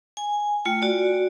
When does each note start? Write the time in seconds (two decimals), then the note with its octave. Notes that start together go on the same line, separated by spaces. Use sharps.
0.17 G#5
0.65 A3 F4 G5
0.82 F#4 D5